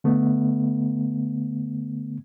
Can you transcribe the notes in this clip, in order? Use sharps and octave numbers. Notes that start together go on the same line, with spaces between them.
D3 A3 B3